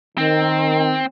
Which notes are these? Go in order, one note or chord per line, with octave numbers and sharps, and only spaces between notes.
D#3 C4